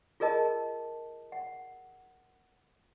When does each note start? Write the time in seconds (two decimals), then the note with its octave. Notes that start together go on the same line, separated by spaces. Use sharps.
0.20 F4 G#4 A#4 D#5 A5
1.32 F#5